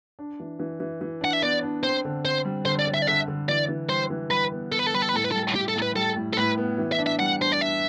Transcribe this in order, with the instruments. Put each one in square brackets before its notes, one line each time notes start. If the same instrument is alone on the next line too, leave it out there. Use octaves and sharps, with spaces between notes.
[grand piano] D4
E3
E3
E3
E3
[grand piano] D4 [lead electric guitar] F#5
[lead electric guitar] E5
[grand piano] B3 [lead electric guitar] D5
[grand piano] D4
[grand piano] C4 [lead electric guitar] C5
[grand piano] D3
[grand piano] C4 [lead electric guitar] C5
[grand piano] G3
[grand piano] D3 [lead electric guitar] C5
[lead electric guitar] D5
[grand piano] D3
[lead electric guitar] E5
D5
[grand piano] D3 [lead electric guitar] E5
[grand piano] D3
[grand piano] E3 [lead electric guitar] D5
[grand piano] E3
[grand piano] G3 [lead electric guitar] C5
[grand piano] E3
[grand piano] G3 [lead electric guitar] B4
[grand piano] B3
[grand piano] B3 [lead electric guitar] A4
[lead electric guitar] B4
A4
[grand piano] G3 [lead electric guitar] B4
[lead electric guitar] A4
B4
[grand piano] A2 [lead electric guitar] A4
[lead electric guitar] B4
A4
[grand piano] G3
[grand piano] A2 [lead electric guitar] G4
[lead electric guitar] A4
[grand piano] A2
[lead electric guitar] B4
[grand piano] G3 [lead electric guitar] A4
[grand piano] A2
[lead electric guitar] A4
[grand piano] A2 [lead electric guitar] B4
[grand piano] B3
E3
[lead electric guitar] E5
[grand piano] D4
[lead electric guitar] E5
[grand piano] G3 [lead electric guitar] F#5
[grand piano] D4 [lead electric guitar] C5
[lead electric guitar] D5
[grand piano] D4 [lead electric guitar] E5